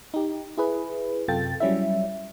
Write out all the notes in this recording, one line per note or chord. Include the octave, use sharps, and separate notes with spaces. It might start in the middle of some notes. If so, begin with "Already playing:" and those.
D#4 G4
E4 G#4 B4
F#2 C3 F4 A4 G5 A6
F#3 G3 C#4 E4 E5